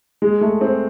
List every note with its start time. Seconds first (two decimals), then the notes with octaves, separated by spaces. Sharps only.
0.22 G#3
0.41 A3
0.61 C4